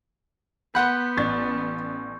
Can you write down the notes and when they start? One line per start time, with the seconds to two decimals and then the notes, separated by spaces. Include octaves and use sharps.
0.75 B3 F#5 B5 C6 G6
1.17 A1 D5 C#6 A6